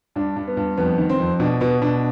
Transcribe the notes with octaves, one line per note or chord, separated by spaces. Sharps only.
G2 D4
G2
B3
G2
F2 B3
D#3
C4
F2
B2 D4
B2 B3
B2 D4